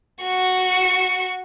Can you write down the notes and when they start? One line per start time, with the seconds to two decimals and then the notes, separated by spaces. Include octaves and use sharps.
0.22 F#4 C#6